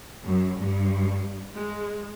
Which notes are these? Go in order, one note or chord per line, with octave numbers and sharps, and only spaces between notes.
F#2
G2
G#3